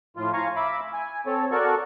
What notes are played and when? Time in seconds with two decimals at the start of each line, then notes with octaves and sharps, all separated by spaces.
0.17 A2 F3 F4
0.33 F5 G#5 A#5 C#6
0.56 E5 B5 D6
0.93 G#5
1.26 C4 A4 C#5
1.51 F#4 A4 A#4 D5 C#6